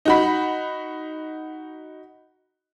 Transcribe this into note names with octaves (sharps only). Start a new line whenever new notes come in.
D#4 F#4 B5